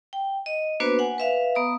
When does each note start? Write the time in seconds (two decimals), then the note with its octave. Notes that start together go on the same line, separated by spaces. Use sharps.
0.13 G5
0.46 D#5
0.80 A#3 B3 D4 F#4 B4 C5
0.99 F#5 G#5
1.18 B4 E5 F5
1.55 B3 A#5 D#6